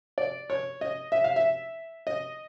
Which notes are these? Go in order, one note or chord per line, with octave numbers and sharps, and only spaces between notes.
D5
C#5
D#5
E5
F5
E5
D#5